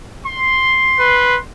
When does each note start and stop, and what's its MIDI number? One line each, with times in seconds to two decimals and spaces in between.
0.25 1.42 84
1.00 1.38 71